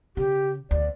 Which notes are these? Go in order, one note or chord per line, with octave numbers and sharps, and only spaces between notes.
C#3 G4
D2 D5